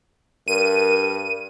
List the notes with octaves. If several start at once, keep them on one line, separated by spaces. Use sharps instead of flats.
G2 A#4 D#7